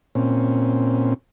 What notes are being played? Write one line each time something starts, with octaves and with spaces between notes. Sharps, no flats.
A#2 C4 C#4